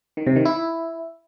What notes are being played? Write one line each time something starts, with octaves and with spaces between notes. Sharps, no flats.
D#3
C3
D#3
E4